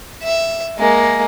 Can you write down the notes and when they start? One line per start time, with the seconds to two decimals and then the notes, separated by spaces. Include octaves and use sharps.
0.23 E5
0.78 G#3 A#3